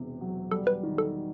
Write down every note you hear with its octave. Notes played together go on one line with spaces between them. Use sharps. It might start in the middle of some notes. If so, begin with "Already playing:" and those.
Already playing: E1 E2 C3
F#3
G3 A4
B4
D#3
A4